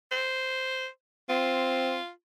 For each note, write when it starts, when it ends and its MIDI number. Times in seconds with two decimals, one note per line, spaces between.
0.11 0.87 72
1.29 1.98 60
1.29 2.09 65